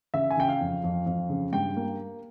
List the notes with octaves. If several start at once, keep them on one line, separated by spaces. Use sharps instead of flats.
C#3 E5
G#5
C#3 G5
F5
F2
F2
F2
C#3
G2 G5
A#3